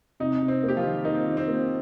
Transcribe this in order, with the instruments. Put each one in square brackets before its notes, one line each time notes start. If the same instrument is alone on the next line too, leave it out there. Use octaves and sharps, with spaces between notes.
[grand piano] C3 [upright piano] D#4
[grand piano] C3
[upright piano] C4
[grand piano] A#3
[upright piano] G4
F3 F4
[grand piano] D#3
[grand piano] A#3 [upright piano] D#4
[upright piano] C4
[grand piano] D#3
[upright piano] C4
[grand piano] A#3